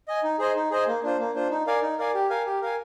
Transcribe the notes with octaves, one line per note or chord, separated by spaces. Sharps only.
D#5 G#5
D#4
G#4 C5 D#5 G#5
D#4
G#4 C5 D#5 G#5
A#3
D4 F4 C5
A#3
D4 F4 C5
D#4
A#4 D5 F5 G#5
D#4
A#4 D5 F5 G#5
G4
A#4 F5 G#5
G4
A#4 F5 G#5